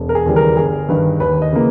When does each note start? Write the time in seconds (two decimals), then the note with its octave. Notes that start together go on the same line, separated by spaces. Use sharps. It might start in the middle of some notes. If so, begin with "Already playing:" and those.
Already playing: E1
0.09 A#4
0.15 G#4
0.26 D#2 C#3 E3 G3
0.36 A#4
0.57 G1 G#4
0.89 G2 D#3 B4
1.20 D#2 B4
1.42 D#5
1.53 C#3 E3 A#3